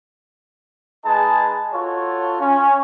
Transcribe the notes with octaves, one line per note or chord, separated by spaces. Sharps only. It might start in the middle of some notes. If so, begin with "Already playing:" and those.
G#3 D#4 G#4 B4 D#5 A5
F4 F#4 A4 C#5
C#4